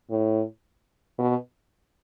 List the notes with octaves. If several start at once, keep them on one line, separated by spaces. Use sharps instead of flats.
A2
B2